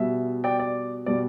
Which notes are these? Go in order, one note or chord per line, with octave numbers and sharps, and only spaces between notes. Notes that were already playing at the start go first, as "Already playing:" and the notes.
Already playing: B2 G3 E5
D5 G5
D5
B2 G3 D5